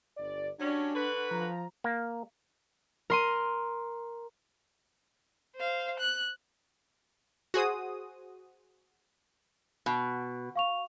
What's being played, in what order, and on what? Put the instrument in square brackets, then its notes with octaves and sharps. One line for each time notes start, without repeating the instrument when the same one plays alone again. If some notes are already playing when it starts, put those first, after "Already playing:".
[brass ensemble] G1 D5
[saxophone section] F#3 G3 C#4 [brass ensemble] D4
[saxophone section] D3 F#4 B4
[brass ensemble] F3 A#5
[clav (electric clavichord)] A#3
[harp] A#4 C6 D#7
[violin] C5 F5
F#6
[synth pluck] F#4 G#4 C5 D#6
[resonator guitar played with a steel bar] B2
[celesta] F5 C#6 F7